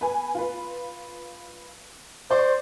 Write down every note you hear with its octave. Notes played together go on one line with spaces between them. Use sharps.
B4 G#5
F4 B4
C5 D5 C6 C#6